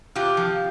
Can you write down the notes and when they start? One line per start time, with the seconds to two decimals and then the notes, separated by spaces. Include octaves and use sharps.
0.15 C3 F4 G4
0.37 F3